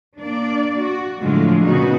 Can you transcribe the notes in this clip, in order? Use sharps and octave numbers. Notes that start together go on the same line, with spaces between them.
A#3 D4 D5
F#4
A2 D3 F3 F#3 G#3 F4
A#2 C#3 G#3 B3 D#4 F#4